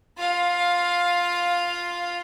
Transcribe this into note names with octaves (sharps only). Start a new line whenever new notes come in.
F4 F5